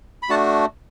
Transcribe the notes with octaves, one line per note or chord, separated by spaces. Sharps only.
B5
A3 D4 F#4 F#5 A5